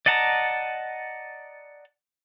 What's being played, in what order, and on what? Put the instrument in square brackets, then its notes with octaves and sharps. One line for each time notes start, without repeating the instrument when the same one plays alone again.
[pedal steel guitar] D5 D#5 F#5 A5 A#5